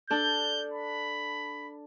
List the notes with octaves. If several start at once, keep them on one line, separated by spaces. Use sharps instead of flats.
D4 A4 G6
B5